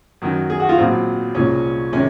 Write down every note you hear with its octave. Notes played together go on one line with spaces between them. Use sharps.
F#2 D#3 F#3
G#4
F#4
F4
A#1 A#2 F#3 C4
C2 A#2 G#3 C#4
C3 D#3 G#3 C#4